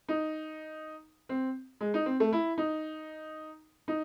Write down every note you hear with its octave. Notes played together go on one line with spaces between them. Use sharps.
D#4
C4
G#3
D#4
C4
A3
E4
D#4
D#4